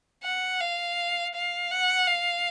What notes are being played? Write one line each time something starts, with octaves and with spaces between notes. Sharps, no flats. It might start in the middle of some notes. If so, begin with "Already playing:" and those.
F#5
F5
F5
F#5
F5